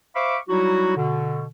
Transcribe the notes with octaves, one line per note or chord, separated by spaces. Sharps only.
C5 E5 F5 B5 C#6 D6
F#3 G3 D#4 E4 F#4
B2 D3